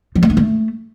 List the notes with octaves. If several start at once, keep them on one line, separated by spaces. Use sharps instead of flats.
F3
A3
D4
A3